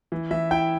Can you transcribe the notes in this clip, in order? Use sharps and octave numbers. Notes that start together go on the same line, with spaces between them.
E3
E3 E5
E4 G5